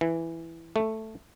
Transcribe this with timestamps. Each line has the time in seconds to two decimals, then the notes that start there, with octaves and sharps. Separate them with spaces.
0.01 E3
0.76 A3